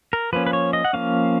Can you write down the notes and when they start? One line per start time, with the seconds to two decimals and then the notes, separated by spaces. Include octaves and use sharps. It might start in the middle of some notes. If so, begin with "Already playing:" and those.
0.13 A#4
0.33 F3 A#3 C#4 B4
0.47 B4
0.53 C#5
0.73 D#5
0.84 F#5
0.93 F3 A#3 C#4 F5